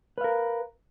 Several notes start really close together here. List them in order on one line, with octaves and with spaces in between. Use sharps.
B4 F5 A#4